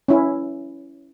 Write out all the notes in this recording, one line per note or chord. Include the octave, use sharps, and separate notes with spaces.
C#4 E4